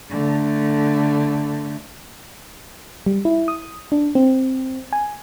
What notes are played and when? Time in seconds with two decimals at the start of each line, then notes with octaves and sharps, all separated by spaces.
0.10 D3 A3
3.06 G3
3.25 E4
3.48 D#6
3.92 D4
4.15 C4
4.93 G#5